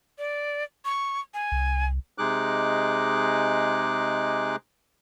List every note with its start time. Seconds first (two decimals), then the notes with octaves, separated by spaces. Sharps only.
0.18 D5
0.85 C#6
1.34 G#5
1.52 C2
2.18 C3 G#3 D#4 G#4 D6 F#6